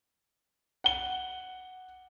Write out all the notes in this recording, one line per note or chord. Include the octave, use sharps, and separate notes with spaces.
F#5 G7